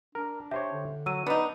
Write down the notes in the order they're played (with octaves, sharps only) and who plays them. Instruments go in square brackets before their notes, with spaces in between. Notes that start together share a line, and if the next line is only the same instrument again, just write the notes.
[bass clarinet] D4 [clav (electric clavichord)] A#4
[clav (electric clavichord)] G4 C5 C#5 [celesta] E5
[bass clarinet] D3
[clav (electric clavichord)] F#3 [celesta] E6 D#7
[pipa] B3 D#4 [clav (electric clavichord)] D4